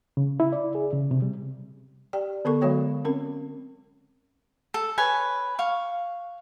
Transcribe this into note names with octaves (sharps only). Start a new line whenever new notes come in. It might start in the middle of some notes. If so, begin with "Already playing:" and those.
C#3
E4
D5
G#4
C#3
C3
G3
G4 D5 G5
D3 B3 A4 A#4 C#6
D3 F#3 G#3 F#4 C#5 G5
C4 C#4 A#4
A4
B4 C#5 G#5
F5 C#6